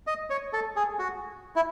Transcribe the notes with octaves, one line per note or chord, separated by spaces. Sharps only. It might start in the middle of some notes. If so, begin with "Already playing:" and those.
D#5
C#5
A4
G#4
F#4
E4